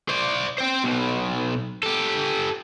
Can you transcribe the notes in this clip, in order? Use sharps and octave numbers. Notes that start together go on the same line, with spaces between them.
C5 D5
C5 G5
B1 B2
G4 A4